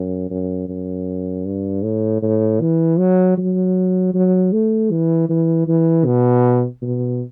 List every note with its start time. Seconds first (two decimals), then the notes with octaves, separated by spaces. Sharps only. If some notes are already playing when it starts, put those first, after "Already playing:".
Already playing: F#2
0.30 F#2
0.69 F#2
1.46 G2
1.84 A2
2.22 A2
2.61 E3
2.99 F#3
3.38 F#3
4.14 F#3
4.53 A3
4.91 E3
5.29 E3
5.68 E3
6.06 B2
6.82 B2